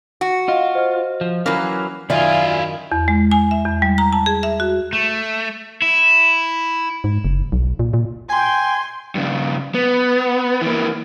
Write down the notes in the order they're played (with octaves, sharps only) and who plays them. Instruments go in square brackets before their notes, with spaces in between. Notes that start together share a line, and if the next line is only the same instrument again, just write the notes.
[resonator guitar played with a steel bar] F#4
[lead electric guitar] F4 [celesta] D#5 F5
[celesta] C5 D#5 F6
[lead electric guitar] F3
[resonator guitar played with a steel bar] E3 A#3 [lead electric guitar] F#3 C#4 [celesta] F6
[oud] F#2 D#3 [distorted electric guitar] E4 F5 [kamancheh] F4 G#5 [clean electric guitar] D5 E5
[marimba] E2
G#3
G#5
E5
E2
G3
A#5
A5
G#4
E5
F#4
[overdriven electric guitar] A3
E4
[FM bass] G#2
F#1
B1
A#2
A#2
[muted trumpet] G5 [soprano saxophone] G#5 [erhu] C6
[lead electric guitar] G2 C#3
B3
E3 A#3